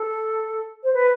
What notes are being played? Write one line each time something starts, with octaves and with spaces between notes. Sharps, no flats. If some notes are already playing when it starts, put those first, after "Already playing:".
Already playing: A4
C5
B4